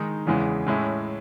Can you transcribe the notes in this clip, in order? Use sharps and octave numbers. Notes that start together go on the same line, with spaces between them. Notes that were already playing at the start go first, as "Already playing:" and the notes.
Already playing: D#3 G#3 D#4
E2 C#3 E3 G#3
A2 G#3 C#4 E4